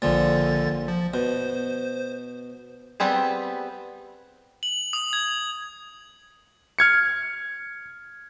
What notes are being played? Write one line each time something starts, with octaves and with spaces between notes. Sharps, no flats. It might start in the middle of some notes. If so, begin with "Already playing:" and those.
A#1 A#2 D3 F3 A6
F3
B2 C5
G3 B3 C4 G#4
F#7
D#6
G#6
F6 G#6 C#7